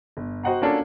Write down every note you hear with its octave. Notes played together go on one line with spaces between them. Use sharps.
G1
F#4 C5 D#5 F#5 G5 A#5
A#3 C#4 D4 F4 F#4 A4